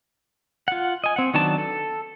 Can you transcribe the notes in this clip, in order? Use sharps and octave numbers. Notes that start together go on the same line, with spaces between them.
F4 F#5
D#5 G#5
C4 F#5
D#3 F#3 B3 D4 A5
A4